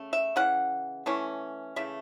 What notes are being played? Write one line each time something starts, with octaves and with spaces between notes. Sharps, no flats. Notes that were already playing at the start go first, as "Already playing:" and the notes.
Already playing: C#3 A3 C#4
E5
C#3 E3 C#4 F#5
E3 A3 C#4
C#3 E3 A3 E5